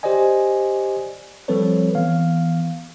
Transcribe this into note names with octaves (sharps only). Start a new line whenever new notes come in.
G4 C5 D5 D#5 G#5
F3 G3 C4 A4 B4 C#5
E3 B3 F5